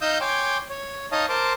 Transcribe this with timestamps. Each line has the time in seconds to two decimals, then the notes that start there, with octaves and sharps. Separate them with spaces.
0.01 D#4 D#5 F5 D#6 E6 G6
0.21 C#5 G5 G#5 C6 D6
0.70 C#5
1.12 D#4 C#5 D#5 F5 A5 D#6
1.29 A#4 C5 A5 C6 D6